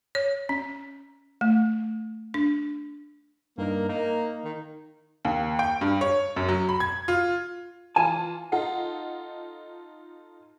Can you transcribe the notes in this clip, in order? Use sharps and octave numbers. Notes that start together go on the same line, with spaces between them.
C#5
C#4
A3
D4
G2 A#3 D#4 A#4
A#3 D#4
D#3
D#2
G5
G2
C#5
F#2
F#3
B5
G#6
F4
E3 F4 G#5 A5
D#4 F4 A4 F#5